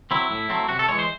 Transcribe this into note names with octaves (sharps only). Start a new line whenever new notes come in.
F#3 C4 E4
A2
F#3 A3 C4
C3 F#4
A4
E3 G#3 C#5
C5